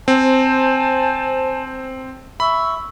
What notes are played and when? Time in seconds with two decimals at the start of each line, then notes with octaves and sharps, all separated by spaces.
0.08 C4 C5 G#5 A5
2.40 E5 B5 C#6 E6